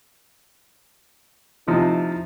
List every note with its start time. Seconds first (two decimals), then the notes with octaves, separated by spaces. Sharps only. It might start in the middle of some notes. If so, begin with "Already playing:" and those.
1.68 C3 F3 D#4 E4